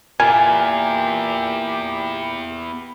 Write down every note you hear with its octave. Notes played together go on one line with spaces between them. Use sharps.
A#2 B3 E4 G4 G#5